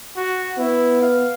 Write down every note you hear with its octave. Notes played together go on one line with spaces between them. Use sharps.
F#4
B3 E4
F5